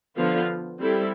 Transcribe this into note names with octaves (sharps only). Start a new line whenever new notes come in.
D3 F3 B3 F4
G3 C4 E4 A4